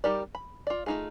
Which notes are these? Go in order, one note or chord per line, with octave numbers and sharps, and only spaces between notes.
G3 D#4 G4 A#4 D5
B5
F4 D5
A3 C4 D#4 F4 G#4